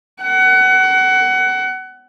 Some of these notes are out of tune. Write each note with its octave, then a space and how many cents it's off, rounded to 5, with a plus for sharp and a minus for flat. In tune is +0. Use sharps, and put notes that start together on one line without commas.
F#5 +25